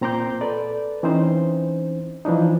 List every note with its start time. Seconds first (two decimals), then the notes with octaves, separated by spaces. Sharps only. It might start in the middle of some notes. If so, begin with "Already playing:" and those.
0.01 A#2 C4 A#5 C6 D6 G6
0.41 A4 B4 D5
1.03 E3 C4 C#4 D#4 C5
2.25 E3 F3 D4 D#4